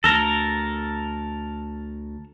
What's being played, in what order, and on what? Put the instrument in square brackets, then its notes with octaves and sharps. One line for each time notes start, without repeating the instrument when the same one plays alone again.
[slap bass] D2 [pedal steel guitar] A4 A#4